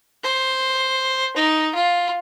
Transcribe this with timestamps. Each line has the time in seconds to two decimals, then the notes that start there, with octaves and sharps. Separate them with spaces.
0.23 C5
1.36 D#4
1.74 F4